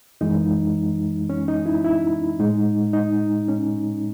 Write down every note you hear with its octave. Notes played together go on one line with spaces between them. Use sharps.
F#2 E3 G#3 D#4
C#4
D#4
E4
E4
A2 G#3 D#4
D#4
C#4